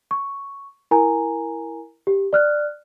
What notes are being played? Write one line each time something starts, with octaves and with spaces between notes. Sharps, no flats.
C#6
E4 A#4 G#5 A#5
G4
D5 F6 F#6